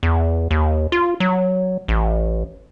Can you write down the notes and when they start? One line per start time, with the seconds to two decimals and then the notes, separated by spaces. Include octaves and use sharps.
0.03 E2
0.51 D#2
0.92 F4
1.20 F#3
1.88 A1